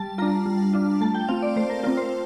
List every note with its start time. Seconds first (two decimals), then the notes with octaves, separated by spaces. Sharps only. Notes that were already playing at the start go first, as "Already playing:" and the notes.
Already playing: G3 A5
0.18 D4 F4 A#5
0.46 G3
0.73 D4 F4
1.01 A3 A5
1.15 G5
1.28 C4 F4 F5
1.42 D5
1.56 A3 C5
1.70 A#4
1.83 C4 F4 A#4
1.97 C5